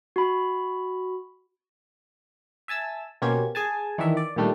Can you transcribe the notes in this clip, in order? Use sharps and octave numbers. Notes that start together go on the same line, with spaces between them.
F#4 B5
E5 G#5 A5 E6
B2 A#3 C#4 G4 C5 G#6
G#4 G#5 A5
D#3 E3 D4 E5
D5
A#2 D#3 G3 A3 D4